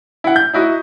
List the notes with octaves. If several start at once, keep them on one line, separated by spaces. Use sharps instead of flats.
E4 F#5
G6
D#4 E4 F#4 D#5